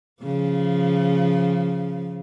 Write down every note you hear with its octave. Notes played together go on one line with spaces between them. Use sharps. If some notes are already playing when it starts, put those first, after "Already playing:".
C#3 F3